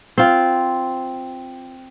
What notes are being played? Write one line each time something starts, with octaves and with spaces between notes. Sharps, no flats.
C4 F4